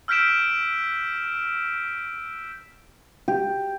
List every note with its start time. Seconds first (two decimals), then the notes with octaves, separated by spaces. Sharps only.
0.08 E6 F6 G6 B6 D7 E7
3.28 G4